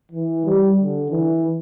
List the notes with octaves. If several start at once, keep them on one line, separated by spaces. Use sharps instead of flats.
E3
G3
D3
E3